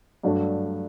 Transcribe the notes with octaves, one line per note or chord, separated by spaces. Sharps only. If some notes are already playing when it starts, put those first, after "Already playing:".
G2 F#3 A3 D4